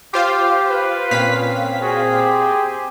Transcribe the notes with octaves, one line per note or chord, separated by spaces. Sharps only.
F4 G4 C5 F5
B4
A#2 C4 C#4 F5 B6
F#4 G#4
G4